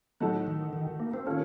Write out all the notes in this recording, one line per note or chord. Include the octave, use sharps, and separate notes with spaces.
A2 F#3 A3 D#4 F#4 A4
D#3
D#3
A#3
C4
D#3 A#3 C#4 F4 A4